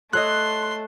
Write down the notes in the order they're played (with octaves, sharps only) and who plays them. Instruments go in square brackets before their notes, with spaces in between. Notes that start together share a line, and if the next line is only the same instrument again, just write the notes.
[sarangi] A3 [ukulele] A4 C#5 D#5 [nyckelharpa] C6 [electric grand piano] F#6